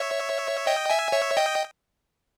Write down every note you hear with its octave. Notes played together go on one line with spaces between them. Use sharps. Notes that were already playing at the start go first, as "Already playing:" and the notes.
Already playing: C#5 E5
D#5 G5
E5 G#5
C#5 E5
D#5 G5